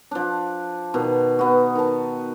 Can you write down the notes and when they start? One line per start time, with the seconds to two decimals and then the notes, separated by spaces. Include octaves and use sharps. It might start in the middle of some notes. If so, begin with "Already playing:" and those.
0.11 F3 D4
0.94 B2 D#3
1.39 B3 F#4
1.75 D#3 A5